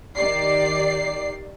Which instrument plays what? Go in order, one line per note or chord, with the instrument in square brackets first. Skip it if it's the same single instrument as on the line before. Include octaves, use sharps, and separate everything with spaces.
[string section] D#3 G4 D5 C7